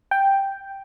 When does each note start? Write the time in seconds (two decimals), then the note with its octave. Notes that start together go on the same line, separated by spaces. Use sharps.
0.11 G5